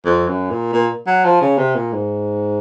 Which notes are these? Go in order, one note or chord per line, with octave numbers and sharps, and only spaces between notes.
F2
F#2
A#2
A#2
F#3
F3
C#3
C3
A#2
G#2